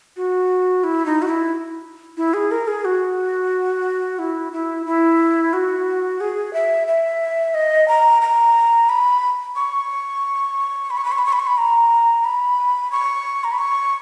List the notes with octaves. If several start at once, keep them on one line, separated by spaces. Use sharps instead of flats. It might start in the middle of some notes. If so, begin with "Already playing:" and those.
F#4
E4
D#4
F#4
E4
E4
G#4
A#4
G#4
F#4
E4
E4
E4
F#4
G#4
E5
E5
D#5
A#5
A#5
B5
C#6
B5
C#6
B5
C#6
B5
C#6
B5
C#6
B5
A#5
B5
C#6
A#5
B5
C#6